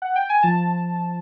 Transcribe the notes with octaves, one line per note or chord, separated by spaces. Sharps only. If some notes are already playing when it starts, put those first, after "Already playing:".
F#5
G5
G#5
F3 A5